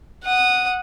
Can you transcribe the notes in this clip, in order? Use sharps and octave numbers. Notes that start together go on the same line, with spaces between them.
F#5 D#6